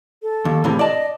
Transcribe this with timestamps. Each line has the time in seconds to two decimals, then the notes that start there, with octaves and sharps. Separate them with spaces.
0.23 A4
0.45 D#2
0.64 A2 C3 E3
0.79 D5 D#5 A5